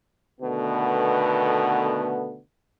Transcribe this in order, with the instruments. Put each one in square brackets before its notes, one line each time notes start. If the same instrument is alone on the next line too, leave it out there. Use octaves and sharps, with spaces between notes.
[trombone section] B2 D3 D#3 A3 B3